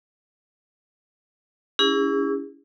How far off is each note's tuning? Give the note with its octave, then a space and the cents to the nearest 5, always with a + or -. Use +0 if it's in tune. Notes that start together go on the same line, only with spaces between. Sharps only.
C#4 +30 E4 +0 G#4 -40